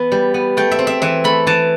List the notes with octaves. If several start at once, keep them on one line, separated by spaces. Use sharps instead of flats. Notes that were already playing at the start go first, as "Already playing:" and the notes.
Already playing: E3 B3 B5
G3
B3
A3 G5
E5
C4
E5
E3 E5
A3 B5
E3 A5